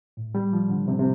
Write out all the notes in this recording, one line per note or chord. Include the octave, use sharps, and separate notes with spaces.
A2
G3
F3
D3
C3
C3